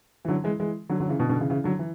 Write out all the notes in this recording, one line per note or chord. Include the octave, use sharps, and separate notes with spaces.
E3
D3 F#3
E3 G#3
E3 G#3
D3 F#3
D3 F#3
C#3 E3
B2 D3
B2 D3
C#3 E3
C#3 E3
D3 F#3
E3